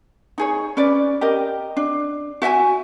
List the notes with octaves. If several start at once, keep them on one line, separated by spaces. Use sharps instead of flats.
D#4 G#4 C#5
C#4 B4 D5
G4 A#4 D#5
D4
F#4 E5 G5 G#5